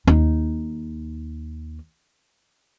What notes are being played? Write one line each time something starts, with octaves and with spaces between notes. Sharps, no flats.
D#2 D#4